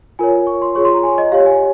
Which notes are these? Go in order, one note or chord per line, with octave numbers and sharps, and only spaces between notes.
F4 A#4 C#5 G#5
C#6
C6
F4 G#4 C#5 C#6
C6
A#5
G#5
D#5
G4 C#5 F5
G#5